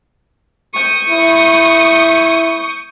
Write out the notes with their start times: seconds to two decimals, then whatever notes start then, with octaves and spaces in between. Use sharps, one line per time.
0.74 C#6 D#6 G6
1.09 E4